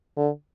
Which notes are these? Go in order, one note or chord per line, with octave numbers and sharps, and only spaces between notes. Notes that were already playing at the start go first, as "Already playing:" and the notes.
D3